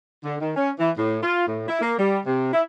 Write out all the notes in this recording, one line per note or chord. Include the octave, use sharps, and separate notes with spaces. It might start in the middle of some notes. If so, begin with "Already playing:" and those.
D3
D#3
C#4
E3
A2
F4
A2
E4
A#3
G3
C3
E4